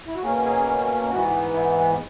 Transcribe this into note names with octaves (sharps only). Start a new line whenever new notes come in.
E4
F#4
B2 A#3 C#4 G#4
G#4
G#2 E3 B3 F#4
E4